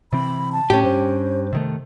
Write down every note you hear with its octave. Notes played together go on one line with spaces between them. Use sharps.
C3 E3 C4 B5
A5
A2 A3 C#4 G4
G2 C5
C3 D#3 A3